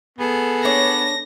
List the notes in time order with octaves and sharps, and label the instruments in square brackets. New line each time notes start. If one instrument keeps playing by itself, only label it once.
[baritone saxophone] B3 [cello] G#4 A4
[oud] D4 C#5 [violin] A#6